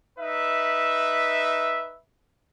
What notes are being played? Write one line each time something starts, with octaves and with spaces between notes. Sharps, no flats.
D#4 B4 E5